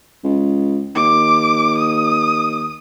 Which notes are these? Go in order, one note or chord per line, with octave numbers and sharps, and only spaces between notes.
C#2
D#2 D6
D#6